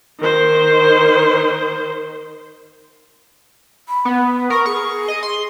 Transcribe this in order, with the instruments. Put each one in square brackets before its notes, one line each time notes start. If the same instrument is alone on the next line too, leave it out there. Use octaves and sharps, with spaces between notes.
[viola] D#3 C5
[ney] B5
[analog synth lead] B3
[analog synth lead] A#4 [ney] C#6
[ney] G#4 [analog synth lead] C#6
[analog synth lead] D#5
C6